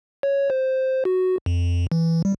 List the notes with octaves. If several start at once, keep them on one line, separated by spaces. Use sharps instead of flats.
C#5
C5
F#4
F2
E3
G3